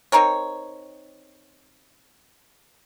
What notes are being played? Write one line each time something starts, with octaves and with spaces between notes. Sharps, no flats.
C4 D#4 A#4 C#5